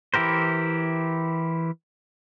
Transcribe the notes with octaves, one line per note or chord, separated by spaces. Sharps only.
E3 E4 G4 A#4 C5